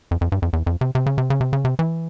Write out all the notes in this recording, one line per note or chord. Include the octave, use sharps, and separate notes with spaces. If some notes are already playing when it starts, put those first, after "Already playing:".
F2
F2
G2
F2
E2
F2
C3
C3
C#3
C3
C#3
C3
C#3
C3
E3